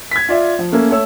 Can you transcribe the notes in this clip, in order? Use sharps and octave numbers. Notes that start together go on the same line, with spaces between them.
G#6 B6
F4 D5 E5
F3
A3 A#3 C#4
A3 C#5 E6